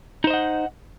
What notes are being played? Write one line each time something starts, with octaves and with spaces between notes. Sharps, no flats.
D#4 C5 D#5 F#5